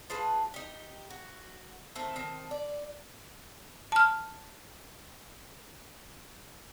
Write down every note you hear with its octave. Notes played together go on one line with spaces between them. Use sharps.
F4 G#4 B4 A5
D#4 G4
F#4
D#3 A3 C4 A4
D#3 C4 A5
D5
A5 F6